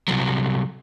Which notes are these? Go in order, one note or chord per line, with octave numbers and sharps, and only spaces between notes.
C2 F#3